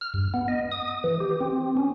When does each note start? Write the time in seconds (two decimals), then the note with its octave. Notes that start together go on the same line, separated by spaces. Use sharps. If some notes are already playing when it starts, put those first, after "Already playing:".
0.01 F6
0.14 G2
0.34 B3
0.48 D#5
0.72 D#6
1.04 E3
1.20 G4
1.40 C4
1.77 C#4